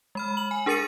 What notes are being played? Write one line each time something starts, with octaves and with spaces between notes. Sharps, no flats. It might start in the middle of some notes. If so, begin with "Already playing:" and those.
G#3 B5 F6
F#7
G#5
D4 G#4 A#4 A6 C#7 D#7